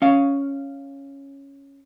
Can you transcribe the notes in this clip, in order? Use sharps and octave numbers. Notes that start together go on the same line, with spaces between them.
C#4 F5